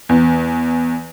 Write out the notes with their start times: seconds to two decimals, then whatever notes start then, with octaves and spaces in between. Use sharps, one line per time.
0.09 E2